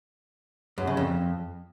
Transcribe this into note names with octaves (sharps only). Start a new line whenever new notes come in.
F#2
C#3
F2